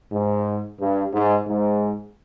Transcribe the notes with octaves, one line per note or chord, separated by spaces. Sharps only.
G#2
G2
G#2
G#2